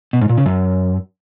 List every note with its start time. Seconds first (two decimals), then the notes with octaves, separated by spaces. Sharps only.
0.13 B2
0.21 G#2
0.29 A#2
0.38 C#3
0.46 F#2